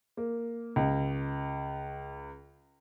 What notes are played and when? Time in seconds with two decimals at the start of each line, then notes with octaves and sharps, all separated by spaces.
0.17 A#3
0.76 C#2